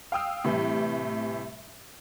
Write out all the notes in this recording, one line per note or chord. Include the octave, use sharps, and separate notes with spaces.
F5 G5 D#6 E6
A2 C3 E3 G3